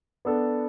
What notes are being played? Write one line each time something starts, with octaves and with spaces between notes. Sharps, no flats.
B3 D4 A4